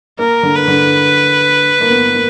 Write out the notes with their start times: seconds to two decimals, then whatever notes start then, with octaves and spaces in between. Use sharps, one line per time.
0.19 A#3 A#4
0.43 D3
0.56 B4
0.68 D3
1.81 A#3
1.90 B3
2.15 A#3